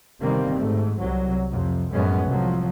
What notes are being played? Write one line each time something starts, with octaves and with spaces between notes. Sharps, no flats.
G1 C3 D#3 G3 A#3 C4
G#2 A3
C2 F#3
F2 C3
F#2 A2 F3 G#3 B3 C#4
C2 F3 F#3